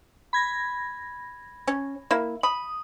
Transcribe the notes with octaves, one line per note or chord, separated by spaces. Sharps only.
B5 G#6 A#6
C#4
A#3 E4
B5 D#6